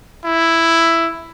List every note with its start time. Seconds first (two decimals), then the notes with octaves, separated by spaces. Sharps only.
0.25 E4